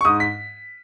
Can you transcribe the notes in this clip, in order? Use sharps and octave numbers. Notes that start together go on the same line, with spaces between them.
C#6
G#2 D#6
B6